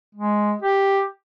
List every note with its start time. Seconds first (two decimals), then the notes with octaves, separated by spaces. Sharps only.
0.15 G#3
0.62 G4